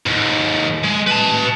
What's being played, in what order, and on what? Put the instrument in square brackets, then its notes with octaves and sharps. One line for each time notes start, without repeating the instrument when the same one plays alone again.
[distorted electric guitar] D#2 G#2
G#3
B4 A5